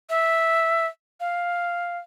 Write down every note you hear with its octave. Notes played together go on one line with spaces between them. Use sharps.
E5
F5